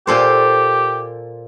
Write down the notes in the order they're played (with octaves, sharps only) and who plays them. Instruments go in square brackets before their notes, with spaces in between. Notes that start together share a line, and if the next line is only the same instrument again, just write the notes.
[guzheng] A#2 A4 C5 [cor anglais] G4